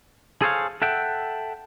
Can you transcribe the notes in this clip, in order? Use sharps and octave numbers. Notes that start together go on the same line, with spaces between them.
G#4 A4 C5 C#5 F5
A4 E5 F#5 G5